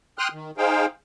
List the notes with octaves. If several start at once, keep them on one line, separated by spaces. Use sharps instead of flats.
G5 C6 D#6 F6 F#6
D#3
D#4 G#4 C5 F5 G5